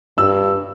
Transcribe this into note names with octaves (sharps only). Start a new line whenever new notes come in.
G2 E6